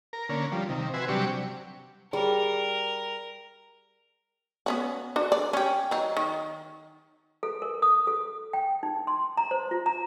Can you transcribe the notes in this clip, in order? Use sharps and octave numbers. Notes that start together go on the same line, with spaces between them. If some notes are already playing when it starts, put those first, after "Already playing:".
A#4
D3 A#3 C#4
F3 G3
C3 D#3
F#4 B4 C5 E5 G#5
C3 F#3 G3 D4 G4 C#6
G3 G#4 A#4
B3 C#4 F#4
D4 F#4
D5
C#4 G4
F#3 D#4
D#3
A4
A#4
D#6
A4
G5
D#4
C6
A#5
C5
F4
A#5